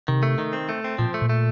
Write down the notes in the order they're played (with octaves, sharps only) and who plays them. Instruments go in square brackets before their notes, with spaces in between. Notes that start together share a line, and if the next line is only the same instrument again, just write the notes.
[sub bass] C3 [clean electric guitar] D#3
[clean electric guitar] A3
D#3
C4
A3
C4
[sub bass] A#2 [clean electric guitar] F3
[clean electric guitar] A3
[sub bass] A#2
[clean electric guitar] A3